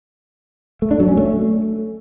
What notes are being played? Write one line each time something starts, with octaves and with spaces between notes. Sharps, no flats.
A3
D4
F#3
C#4
A3